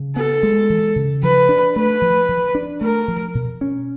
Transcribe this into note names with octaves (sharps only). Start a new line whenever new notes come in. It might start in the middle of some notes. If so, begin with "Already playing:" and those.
Already playing: C#3
B3 A4
G#3
E3
C#3
F3 B4
D4
A3 B4
F3
F3
D4
A3 A#4
F3
B2
C#4